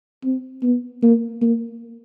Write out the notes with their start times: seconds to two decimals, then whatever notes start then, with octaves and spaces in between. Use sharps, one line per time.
0.24 C4
0.63 B3
1.02 A#3
1.42 A#3